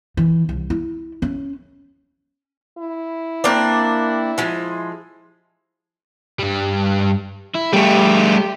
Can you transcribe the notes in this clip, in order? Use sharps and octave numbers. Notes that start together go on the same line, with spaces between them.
E3
C2
E4
C#4
E4
A#3 C4 D4
F3 G#3
G2 G3
E4
G3 A3 G4